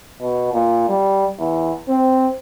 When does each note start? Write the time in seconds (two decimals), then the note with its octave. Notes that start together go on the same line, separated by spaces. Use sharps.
0.21 B2
0.53 A#2
0.89 G3
1.39 E2
1.89 C4